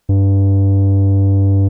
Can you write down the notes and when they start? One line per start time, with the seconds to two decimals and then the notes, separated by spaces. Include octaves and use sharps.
0.09 G2